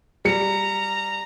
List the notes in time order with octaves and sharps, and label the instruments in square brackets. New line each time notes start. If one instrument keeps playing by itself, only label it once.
[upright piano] G3 C#7 [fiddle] A#5